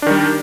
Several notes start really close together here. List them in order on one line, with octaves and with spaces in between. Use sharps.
D4 D#3 G3